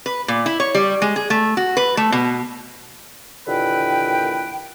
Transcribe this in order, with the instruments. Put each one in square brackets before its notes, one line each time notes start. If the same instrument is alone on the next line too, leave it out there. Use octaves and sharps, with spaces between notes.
[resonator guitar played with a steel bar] B4
A#2
E4
C#5
G3
G#3
G#4
A3
F#4
B4
A3
B2
[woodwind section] D#2 A#2 D3 E3 B4 G5